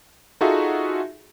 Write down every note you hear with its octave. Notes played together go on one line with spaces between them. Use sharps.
D#4 F4 F#4 G#4 A4 E5